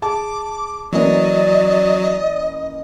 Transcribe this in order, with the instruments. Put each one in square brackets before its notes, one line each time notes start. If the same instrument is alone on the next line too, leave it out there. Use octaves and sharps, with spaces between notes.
[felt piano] G#4 A5 [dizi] D6
[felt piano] E3 A#3 C#4 [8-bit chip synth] F#3 [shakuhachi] D5 [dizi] D#5